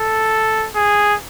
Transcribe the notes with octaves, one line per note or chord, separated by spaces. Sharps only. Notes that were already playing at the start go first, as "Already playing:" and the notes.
Already playing: A4
G#4